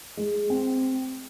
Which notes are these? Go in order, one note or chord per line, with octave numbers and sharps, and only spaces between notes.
G#3
C4